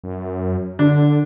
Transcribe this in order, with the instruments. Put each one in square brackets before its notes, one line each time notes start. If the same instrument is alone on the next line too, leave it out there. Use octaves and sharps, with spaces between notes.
[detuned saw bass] F#2
[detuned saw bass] D3 [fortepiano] D4